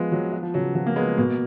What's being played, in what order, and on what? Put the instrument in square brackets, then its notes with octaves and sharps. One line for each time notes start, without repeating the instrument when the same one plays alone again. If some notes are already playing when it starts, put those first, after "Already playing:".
Already playing: [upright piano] F3 B3 F4 [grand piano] G#3
[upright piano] F3 [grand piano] F#3
[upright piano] F4
[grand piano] F3
[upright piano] C#3 [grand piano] F#3
[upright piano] F3 [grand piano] F#3
[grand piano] A#3
[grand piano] G#3 [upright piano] B3
[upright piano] B2 [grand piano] A#3